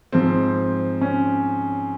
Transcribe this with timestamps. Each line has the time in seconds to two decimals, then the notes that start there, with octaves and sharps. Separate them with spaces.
0.12 G#2 F3 C4
1.01 C#4